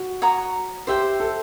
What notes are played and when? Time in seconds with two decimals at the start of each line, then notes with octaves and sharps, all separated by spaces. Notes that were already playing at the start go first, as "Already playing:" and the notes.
Already playing: F#4
0.22 C#5 F#5 A#5 D#6
0.87 G4 C5 E5 G5
1.20 A4